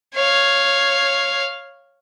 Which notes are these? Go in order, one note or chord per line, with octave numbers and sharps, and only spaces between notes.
C#5 F5